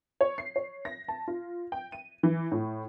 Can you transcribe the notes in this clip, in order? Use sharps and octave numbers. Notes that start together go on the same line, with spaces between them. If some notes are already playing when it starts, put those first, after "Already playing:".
C#5
C7
C#5
A#6
A5
F4
G5
D#7
E3
A2